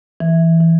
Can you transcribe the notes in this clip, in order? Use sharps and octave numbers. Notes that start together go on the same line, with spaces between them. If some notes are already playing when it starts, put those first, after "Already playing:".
E3
E3